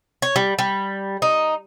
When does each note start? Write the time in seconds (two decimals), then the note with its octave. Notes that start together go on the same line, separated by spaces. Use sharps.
0.22 C#5
0.36 G3
0.59 G3
1.22 D#4